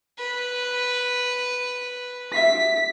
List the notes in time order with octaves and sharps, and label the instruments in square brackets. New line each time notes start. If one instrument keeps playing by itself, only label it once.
[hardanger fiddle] B4
[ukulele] E5 F5 [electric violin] B6